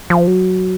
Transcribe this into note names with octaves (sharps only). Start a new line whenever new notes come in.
F3
F#3